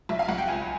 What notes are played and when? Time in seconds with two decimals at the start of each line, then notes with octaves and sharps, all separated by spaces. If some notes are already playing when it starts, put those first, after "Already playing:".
0.09 B1 E5
0.19 F5
0.29 B1 F#5
0.38 G5
0.48 C#2 G#5